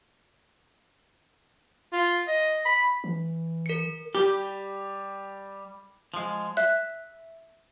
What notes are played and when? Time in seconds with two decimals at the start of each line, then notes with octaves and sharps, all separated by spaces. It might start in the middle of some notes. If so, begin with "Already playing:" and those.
1.92 F4
2.28 D#5
2.66 B5
3.04 E3
3.66 A#4 C#7
4.15 G3 G4
6.14 F3 G#3
6.57 E5 F#6